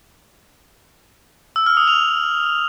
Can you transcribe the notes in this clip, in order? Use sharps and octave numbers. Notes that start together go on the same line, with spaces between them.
E6
F6
D#6
F7